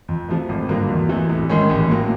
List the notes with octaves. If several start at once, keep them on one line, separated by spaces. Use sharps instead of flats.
F2
C3 F3 A3
G#1
G2 D3 F#3 A#3
E2
C3 E3 A3
A1
G#2 D#3 G#3 C#4
A1
A2 F#3 A#3